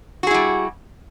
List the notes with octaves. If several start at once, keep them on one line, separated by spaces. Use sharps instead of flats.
G3 E4 F#4 G#4